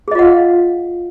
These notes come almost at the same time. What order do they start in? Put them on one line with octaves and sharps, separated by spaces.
G#4 D#5 F4 F#5 F5